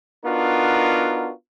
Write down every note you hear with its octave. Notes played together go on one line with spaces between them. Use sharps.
B3 D4 D#4 F4 F#4 A#4